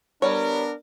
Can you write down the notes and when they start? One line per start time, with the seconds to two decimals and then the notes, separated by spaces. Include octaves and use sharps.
0.22 G3 B3 D4 A#4 C#5